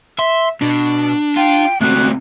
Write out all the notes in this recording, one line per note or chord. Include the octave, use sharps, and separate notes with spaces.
E5 C6
B2 D4
F4 G5
C#2 C3 A3 F#4 F#6